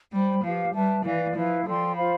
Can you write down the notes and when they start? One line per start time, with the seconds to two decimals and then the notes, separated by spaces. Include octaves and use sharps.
0.12 G3 C5 G5 B5
0.43 F3 G4 B4 F5
0.74 G3 B4 E5 A5
1.04 E3 E4 B4 D5 F5
1.35 F3 E4 B4 F5
1.66 F3 A4 D5 G5 C6
1.96 F4 C5 F5 B5